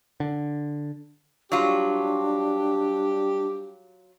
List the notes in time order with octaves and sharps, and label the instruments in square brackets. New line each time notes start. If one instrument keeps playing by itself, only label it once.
[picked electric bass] D3
[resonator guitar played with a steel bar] F#3 F4 [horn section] G3 G4 [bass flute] D4